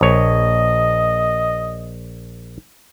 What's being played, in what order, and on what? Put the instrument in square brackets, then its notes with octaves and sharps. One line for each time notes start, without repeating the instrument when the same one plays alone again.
[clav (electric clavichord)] A#1 C#5 [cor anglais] D#5